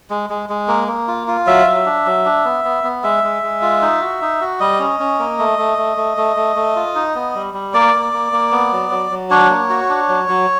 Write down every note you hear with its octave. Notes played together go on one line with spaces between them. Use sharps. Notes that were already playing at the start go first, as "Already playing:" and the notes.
G#3
G#3
G#3
A#3
A#3
F4
F4
F#3 E5
F#3
D4
F#3
D4
B3
B3
B3
G#3 E5
G#3
G#3
F4
D#4
F#4
D#4
F#4
G3 D#5
C#4
C#4
A#3
A3
A3
A3
A3
A3
A3
A3
F4
D#4
B3
G3
G3
A#3 D5
A#3
A#3
A#3
B3
F#3
F#3
F#3
D4 C#5
A#3
F#4
D4
F#3
F#3